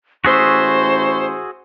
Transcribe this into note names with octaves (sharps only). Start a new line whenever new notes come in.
A1 F#4 G#4 C5 E5 C#6